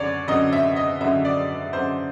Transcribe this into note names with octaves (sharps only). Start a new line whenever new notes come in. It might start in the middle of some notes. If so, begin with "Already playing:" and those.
Already playing: F#2 D3 C#5 D5
F#2 D3 D#5
E5
D#5
F#2 D3 E5
D5
F#2 D3 C5